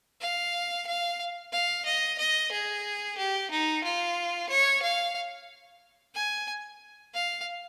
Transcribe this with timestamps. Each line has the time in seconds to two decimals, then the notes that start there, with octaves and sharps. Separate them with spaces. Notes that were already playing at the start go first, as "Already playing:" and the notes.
0.21 F5
0.87 F5
1.52 F5
1.86 D#5
2.19 D#5
2.52 G#4
3.17 G4
3.51 D#4
3.84 F4
4.49 C#5
4.82 F5
6.15 G#5
7.14 F5